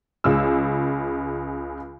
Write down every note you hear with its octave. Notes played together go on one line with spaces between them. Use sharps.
C#2 C#3 E6